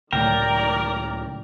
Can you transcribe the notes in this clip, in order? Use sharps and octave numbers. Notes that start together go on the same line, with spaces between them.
C#2 A2 D#3 F#3 A#4 D5 G5 A#5